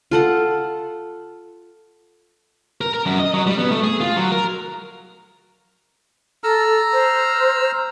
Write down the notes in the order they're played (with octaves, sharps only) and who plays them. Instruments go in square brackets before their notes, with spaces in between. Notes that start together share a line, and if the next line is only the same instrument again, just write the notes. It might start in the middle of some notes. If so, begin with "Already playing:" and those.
[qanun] F4 A4 F#5
[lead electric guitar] A#4
A#4
F#2
D#5
F#3
G3
B3
A3
G#4
F4
F#3
A#4
[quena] A4 [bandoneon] A#5 E6 F6
[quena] C5